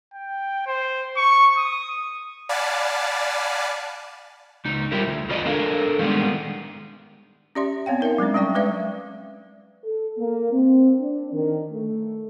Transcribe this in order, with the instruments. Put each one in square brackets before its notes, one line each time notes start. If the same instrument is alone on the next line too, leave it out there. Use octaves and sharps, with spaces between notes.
[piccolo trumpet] G5
C5
C#6
D#6
[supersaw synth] D5 F5 F#5 G#5 A5 B5
[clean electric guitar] C#2 D#4
G3 E4 F4 G4 A#4
D2
F4 F#4 B4 D5 D#5
D4 A4 A#4 F5
D#3 E3 G3 G#3 B3
[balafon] C#4 G4 D5 E5 C6
B3 C4 C#5 F5 G5
D#4 A#4 D5 E5
F#3 G#3 C4 D4
G3 C#4 D5 G5 C#6
F#3 G#3 B4 D5 E5
[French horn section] A4
A#3
C4
D4
D#3
A3